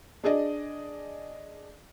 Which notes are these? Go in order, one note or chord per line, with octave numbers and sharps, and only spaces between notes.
D4 G#4 D5 D#5